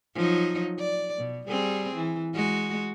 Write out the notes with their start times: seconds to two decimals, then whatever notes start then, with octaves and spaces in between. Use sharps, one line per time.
0.15 F3 F#3 D#4
0.79 D5
1.18 B2
1.48 G3 C4 G#4
1.95 E3
2.35 G#3 F#4